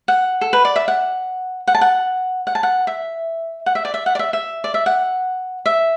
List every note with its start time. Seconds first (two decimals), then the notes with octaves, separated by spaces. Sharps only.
0.08 F#5
0.41 A4
0.53 B4
0.65 D5
0.76 E5
0.88 F#5
1.67 F#5
1.75 A5
1.81 F#5
2.47 F#5
2.55 A5
2.63 F#5
2.87 E5
3.66 F#5
3.75 E5
3.85 D5
3.94 E5
4.06 F#5
4.15 D5
4.19 E5
4.33 E5
4.64 D5
4.74 E5
4.86 F#5
5.66 E5